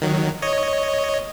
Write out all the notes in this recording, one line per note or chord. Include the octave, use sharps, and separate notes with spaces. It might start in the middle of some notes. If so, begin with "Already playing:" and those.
D#3 F#3
C#5 D#5